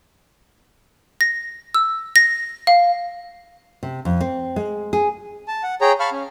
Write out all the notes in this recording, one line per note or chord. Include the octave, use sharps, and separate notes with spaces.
A#6
E6
A#6
F5
C3
F2
C4
G#3
G#4
A5
F#5
G#4 C#5 G5 A#5
F5 A5 B5 C#6 F6
C#4